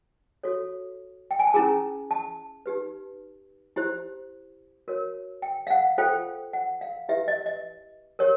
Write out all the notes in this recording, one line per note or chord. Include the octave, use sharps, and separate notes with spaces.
F#4 A4 C#5
G5
G#5
A5
C#4 E4 G#4 A#5
A5
D#4 G4 B4
E4 G4 C5
F#4 A#4 C#5
G5
F5
F#5
F4 A4 C5 G5
F#5
F5
E4 G4 B4 E5
D#5
D#5
G4 A#4 C#5